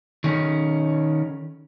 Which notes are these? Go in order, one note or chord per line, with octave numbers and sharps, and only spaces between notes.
D#3 C#4